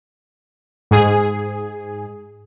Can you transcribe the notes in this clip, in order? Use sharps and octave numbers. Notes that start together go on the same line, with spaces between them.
G#2 G#4